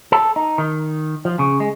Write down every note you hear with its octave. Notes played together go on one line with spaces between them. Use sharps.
A4
D#4
D#3
F3
C#3
G#3